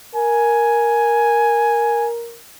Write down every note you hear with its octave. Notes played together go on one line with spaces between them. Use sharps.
A#4 G#5